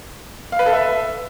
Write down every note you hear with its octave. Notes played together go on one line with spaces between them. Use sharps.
F5
B4
A4
E5